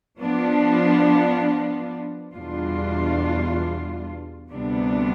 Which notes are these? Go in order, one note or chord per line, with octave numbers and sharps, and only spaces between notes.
F3 B3 D4
E2 B2 G3 D4 F4
D2 C3 G3 B3 D4